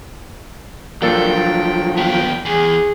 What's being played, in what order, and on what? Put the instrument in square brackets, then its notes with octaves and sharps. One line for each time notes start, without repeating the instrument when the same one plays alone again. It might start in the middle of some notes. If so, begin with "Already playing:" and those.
[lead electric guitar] F3 F#3 [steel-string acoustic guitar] A#3 D4 A4 [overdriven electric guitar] G5
[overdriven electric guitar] D#3 B3 [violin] G5
[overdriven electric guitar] E2 [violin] G#4